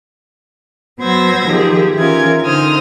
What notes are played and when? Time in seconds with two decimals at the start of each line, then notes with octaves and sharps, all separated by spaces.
1.01 F#3 B3 C5 E6 G#6 A#6
1.47 D#3 F3 G4 G#4
1.96 E3 C#4 F4 A#4 G#6
2.43 D3 D#4 C5 D#6 F6